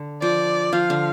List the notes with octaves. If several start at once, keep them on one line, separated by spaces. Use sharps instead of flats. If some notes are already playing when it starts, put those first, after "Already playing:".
Already playing: D3
F3 D5
F3 F5
D3